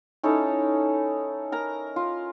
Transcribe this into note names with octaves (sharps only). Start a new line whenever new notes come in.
C#4 D#4 E4 A4
A#4 A#5
F4